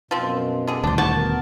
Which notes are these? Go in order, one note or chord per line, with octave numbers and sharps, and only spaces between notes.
F#2 B2 F3 C4
D3 G#4
D#1 D2 D4 C5
F#4 A5
B3 A#4